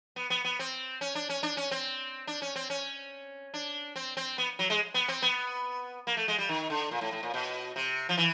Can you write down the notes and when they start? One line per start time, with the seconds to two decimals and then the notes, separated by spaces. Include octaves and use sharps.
0.16 B3
0.30 B3
0.44 B3
0.59 C4
1.01 C#4
1.15 D4
1.29 C#4
1.43 D4
1.57 C#4
1.71 C4
2.27 D4
2.42 C#4
2.56 C4
2.70 C#4
3.54 D4
3.96 C4
4.17 C4
4.38 B3
4.59 F#3
4.70 G#3
4.94 B3
5.08 C4
5.22 B3
6.07 A#3
6.17 A3
6.28 G#3
6.38 G3
6.49 D#3
6.70 D3
6.91 A#2
7.01 A2
7.12 A2
7.23 A#2
7.34 B2
7.76 C3
8.09 F3
8.18 E3